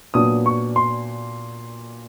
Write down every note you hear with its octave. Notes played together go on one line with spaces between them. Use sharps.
A#2 F#3 B3 D4 D#6
C#6
C6